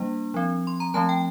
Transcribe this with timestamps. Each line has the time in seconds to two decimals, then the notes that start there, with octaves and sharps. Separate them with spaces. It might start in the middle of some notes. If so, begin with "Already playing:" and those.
Already playing: G3 A#3 D4
0.34 F3 C4
0.67 C6
0.80 A#5
0.94 F3 A3 C4 A5
1.09 G5